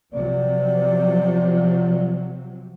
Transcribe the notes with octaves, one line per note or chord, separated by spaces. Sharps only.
C3 F3 F#3 D5